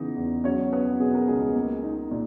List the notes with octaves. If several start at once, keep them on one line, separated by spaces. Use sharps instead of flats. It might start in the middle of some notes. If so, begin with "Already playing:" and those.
Already playing: C#3 E3 B3 D#4
E2
F#3 C#4 C#5
B3 B4
B2 G#4
A#4
C#2 G#4
A#3
D#4
A#2